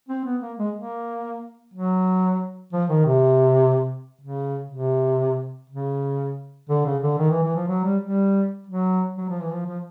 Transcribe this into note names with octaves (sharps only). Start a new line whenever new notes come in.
C4
B3
A#3
G#3
A#3
F#3
F3
D#3
C3
C#3
C3
C#3
D3
C#3
D3
D#3
E3
E3
F3
F#3
G3
G3
F#3
F#3
F3
E3
F3
F3